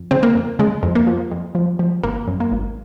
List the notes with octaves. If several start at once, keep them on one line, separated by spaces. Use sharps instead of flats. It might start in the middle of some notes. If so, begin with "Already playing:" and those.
Already playing: F2
C#3 C4
A#3
F2
C#3 G#3
F2
A#3
F3
F2
F3
F3
G#1 A#3
F#2
A#3
G#1